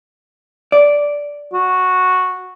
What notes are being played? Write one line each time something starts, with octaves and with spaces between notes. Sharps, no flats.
D5
F#4